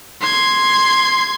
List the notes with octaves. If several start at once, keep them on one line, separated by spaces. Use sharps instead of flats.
C6 G#6